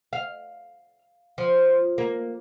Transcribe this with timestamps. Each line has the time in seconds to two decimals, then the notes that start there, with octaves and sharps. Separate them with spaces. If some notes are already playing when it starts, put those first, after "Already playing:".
0.13 F5
1.38 F3
1.98 A#3